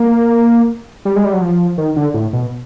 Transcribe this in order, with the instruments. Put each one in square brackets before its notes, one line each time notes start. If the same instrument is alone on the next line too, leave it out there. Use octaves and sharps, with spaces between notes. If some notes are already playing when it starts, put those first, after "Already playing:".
Already playing: [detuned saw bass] A#3
G3
G#3
G3
F#3
F3
D#3
D3
A2
B2